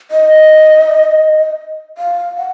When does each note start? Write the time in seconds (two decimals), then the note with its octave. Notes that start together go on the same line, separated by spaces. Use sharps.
0.11 D#5
1.98 F5
2.38 F#5